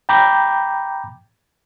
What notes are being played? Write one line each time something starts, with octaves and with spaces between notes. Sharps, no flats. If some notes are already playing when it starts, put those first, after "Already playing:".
G5 A#5 B5 D6 G6